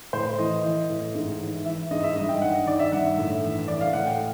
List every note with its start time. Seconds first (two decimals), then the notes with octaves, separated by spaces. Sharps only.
0.13 A2 C5
0.38 E3 D#5
0.64 E3
0.89 A2
1.15 G#2
1.40 E3
1.65 E3 E5
1.91 G#2 D#5
2.03 E5
2.16 G2 D#5
2.29 G5
2.42 D#3 F#5
2.53 D#5
2.66 D#3 D5
2.79 E5
2.92 G2 F#5
3.18 A2 E5
3.43 E3
3.68 E3 D5
3.81 F5
3.93 A2 F#5
4.06 G5